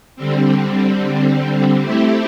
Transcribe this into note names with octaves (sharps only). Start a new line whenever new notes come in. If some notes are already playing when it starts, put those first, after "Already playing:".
D3 G3 C4
A3 C4 E4 G4